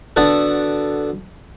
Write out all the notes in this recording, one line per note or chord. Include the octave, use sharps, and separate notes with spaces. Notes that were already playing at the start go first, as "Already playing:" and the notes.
D3 B3 F#4 A4